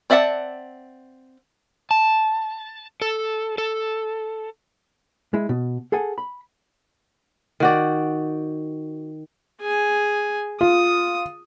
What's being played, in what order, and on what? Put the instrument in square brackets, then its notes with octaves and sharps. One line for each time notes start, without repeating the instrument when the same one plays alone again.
[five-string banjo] C4 D5 E5 F#5 A5
[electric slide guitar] A5
A4
A4
[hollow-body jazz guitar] G#3 E4
B2
G#4 A4 F#5 G#5
B5
[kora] D#3 F#4 D5
[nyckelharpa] G#4 G#5
[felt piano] F4 [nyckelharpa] D#6